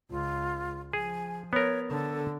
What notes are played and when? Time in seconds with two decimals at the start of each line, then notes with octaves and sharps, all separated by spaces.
0.10 C#2 F4
0.93 F3 G#4 G#5
1.53 B3 A#4 C#5
1.90 D3 A4